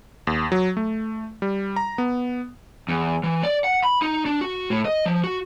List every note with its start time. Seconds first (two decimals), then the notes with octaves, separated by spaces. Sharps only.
0.27 D#2
0.52 F#3
0.77 A3
1.42 G3
1.76 A#5
1.98 B3
2.89 E2
3.24 E3
3.43 D5
3.64 F#5
3.84 B5
4.02 D#4
4.26 D4
4.41 F#4
4.70 A2
4.85 D#5
5.06 F3
5.24 F#4